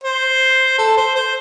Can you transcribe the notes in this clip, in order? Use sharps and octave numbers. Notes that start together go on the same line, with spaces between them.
C5
A4
C5
C5